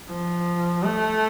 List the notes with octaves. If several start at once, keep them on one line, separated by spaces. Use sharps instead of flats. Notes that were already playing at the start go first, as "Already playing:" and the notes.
F3
A3